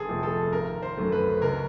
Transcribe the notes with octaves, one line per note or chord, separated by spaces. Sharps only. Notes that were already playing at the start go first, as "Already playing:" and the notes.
Already playing: G1 G#4 A4
F2 C3 F3 A3
A4
G#1 A#4
C5
F#2 D3 F#3 A3
B4
C#2 A#4